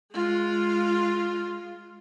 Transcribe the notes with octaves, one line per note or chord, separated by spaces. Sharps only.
G#3 F4